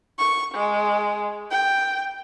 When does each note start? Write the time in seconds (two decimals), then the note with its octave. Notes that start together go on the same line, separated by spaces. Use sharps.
0.19 C#6
0.55 G#3
1.52 G5